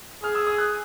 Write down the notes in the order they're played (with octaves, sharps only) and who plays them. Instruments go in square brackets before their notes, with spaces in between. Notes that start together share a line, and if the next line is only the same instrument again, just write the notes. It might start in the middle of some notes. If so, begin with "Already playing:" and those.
[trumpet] G#4 [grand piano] F6
[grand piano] E6
D#6
F#6